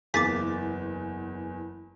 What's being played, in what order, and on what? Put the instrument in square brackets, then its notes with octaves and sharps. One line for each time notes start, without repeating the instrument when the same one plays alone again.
[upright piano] F#1 E2 [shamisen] A#3 F4 G#4 [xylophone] D6 A6 B6